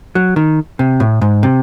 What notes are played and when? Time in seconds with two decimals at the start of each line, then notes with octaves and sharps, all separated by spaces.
0.15 F#3
0.36 D#3
0.79 C3
1.00 A2
1.21 G#2
1.43 C3